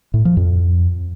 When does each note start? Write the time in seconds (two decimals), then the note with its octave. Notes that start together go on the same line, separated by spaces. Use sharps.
0.14 A2
0.25 F3
0.37 F2